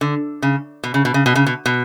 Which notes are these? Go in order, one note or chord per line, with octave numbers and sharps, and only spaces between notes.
D3
C#3
B2
C#3
B2
C#3
B2
C#3
B2
B2